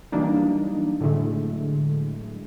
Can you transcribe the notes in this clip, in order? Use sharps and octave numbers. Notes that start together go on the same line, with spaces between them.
E3 F#3 G3 A#3 D4 D#4
A2 D3 F#3 G#3 A3